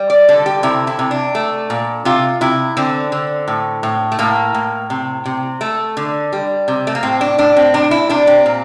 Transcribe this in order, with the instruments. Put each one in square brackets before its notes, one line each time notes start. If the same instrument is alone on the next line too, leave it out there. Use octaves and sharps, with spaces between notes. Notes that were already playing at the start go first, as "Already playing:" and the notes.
Already playing: [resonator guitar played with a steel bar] G3
D5
D3 A4
G4
C3 E4
E4
C3
D4
A3
A#2
C3 F4
C3 E4
D3 C4
D3
A2
A2
A3
A2 A#3
A2
C3
C3
A3
D3
G3
C3
A3
A#3
A2 C4
D4
A2 D4
C4
C3 D4
E4
C3 D4
C4
A#2